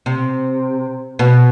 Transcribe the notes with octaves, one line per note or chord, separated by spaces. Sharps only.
C3
B2